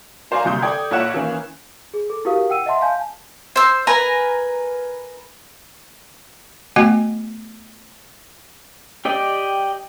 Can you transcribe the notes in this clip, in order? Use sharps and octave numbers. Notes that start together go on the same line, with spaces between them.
F#4 C5 D5 F5 G#5 A#5
F#1 C2 F#2 D3 D#6 G6
A4 D5 G5 D#6 G#6
A#1 E4 C#5 F#5 F#6 E7
D#3 E3 A#3 C#4
G#4
A4
E4 F#4 G4 A#4 F5 D#6
F#5 G5 E6 D#7
D#5 E5 F#5 A5 C6
F5 G#5 A5 G6
C5 E6
A#4 B4 G#5 A#5
A3 B3 F#4 D#5 F#5 G#5
G4 D5 D#5 G5